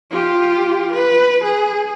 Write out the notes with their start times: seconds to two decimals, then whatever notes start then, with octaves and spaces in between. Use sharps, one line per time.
0.10 F4 G4
0.92 B4
1.44 G#4